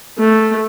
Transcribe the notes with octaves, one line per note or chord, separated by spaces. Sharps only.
A3